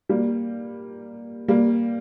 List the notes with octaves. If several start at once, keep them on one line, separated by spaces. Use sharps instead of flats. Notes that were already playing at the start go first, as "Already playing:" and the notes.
G3 A#3
G3 A#3